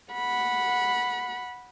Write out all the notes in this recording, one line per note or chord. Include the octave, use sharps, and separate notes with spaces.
F#5 B5